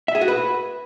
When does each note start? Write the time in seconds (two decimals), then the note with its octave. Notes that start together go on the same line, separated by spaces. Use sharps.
0.08 E5
0.15 G#4
0.21 F#4
0.28 B4